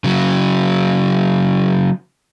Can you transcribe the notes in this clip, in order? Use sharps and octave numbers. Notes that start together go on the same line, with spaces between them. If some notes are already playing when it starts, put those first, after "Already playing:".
C#3 F#3